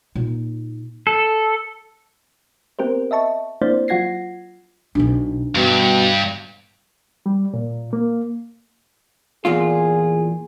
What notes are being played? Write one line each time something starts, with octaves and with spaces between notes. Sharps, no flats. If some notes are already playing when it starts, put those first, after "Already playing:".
A#2 D#4
A4
B3 C4 G4 A#4 C5
D#5 E5 A5 C#6
A#3 C4 D4 E4 C5 D5
F#3 F4 F#5 G#6 A#6 C7
B1 B2 D4
G2 B2 D3
G3
A#2
A#3
E2 A#2 F4 G#4